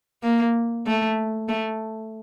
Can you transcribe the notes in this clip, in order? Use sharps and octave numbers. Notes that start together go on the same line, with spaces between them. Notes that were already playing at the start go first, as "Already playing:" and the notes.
A#3
A3
A3